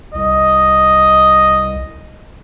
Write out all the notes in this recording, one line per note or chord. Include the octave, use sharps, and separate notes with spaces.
C2 D#5